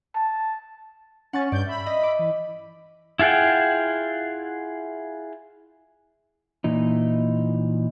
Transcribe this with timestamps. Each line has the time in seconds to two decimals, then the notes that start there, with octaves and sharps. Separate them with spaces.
0.15 A5
1.33 C#4 F#5 C#6 A6
1.52 G2 D5 G6
1.66 E5 B5
1.86 D#5
2.03 D6
2.19 E3
3.19 E4 F4 G#4 F#5 G5
6.64 A#2 E3 D#4